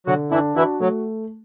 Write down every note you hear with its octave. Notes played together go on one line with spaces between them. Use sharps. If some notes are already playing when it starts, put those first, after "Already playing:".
D3 F#3 F#4
E3 D4 E4
E3 E4 F#4
F#3 A3